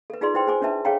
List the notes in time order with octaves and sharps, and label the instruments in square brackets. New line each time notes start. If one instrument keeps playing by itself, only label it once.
[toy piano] A4 B4
D#4 F4 G#4 B4 D5 C6
E4 B4 C5 G5 C6
G#4 C5 G#5 D6
C#4 D4 B4 E5 A5
G#4 A4 C#5 F5 G5 A#5